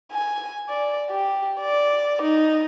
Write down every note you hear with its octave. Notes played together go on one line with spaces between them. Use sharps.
G#5
D5
G4
D5
D#4